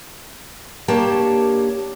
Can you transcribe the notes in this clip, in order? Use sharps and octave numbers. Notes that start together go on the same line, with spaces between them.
A#3 D4 G4 C#5 A5